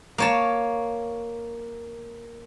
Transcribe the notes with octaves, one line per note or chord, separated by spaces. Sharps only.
A#3 C#5 A5